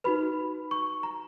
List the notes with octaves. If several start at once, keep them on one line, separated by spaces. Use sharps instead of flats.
D#4 F#4 B4 B5
C#6
A#5